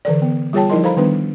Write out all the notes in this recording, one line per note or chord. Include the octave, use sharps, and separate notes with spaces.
D3 E3 A4 D5
B3
G3 F4 G#4 C#5 G5 A5
F3 D#4 E4 A#4 D#5 C6
A4 C5 F5 A#5 B5
D#3 G3 B3 D4 B4